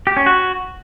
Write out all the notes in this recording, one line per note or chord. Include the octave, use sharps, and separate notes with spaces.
G4
C#4
F#4